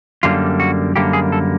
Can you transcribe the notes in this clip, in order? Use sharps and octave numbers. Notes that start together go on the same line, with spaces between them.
F#2 D3 G3 A#3 F4
F#4
F#2 D3 G3 A#3 G4
G#4
A4